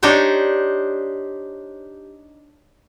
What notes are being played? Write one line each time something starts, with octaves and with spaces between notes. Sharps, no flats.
D4 D#4 G4 C5 C#5